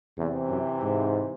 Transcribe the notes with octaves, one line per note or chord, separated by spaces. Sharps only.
E2 C3 E3 C4
F#2
G#2